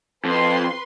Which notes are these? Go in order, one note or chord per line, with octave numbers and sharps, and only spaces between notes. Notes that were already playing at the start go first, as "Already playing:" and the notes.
F2 B4 C6